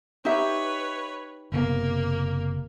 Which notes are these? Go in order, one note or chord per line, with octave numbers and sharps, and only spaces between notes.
D#4 G4 B4 C#5 E5
F#1 C3 A#3 B3